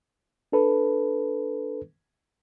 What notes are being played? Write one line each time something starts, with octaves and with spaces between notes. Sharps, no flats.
D4 A4 B4